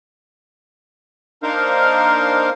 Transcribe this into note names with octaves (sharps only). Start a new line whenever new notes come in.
A#3 D4 D#4 A#4 C5 F5